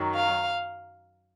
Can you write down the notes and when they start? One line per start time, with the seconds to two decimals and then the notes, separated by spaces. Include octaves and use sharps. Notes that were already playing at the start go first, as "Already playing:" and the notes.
Already playing: F#2 D#3 F#3
0.14 F5